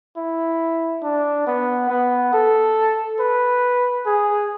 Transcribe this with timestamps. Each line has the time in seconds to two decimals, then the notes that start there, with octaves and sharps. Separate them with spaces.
0.16 E4
1.03 D4
1.47 B3
1.90 B3
2.33 A4
3.20 B4
4.06 G#4